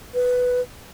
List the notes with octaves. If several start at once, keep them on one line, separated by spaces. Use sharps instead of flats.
B4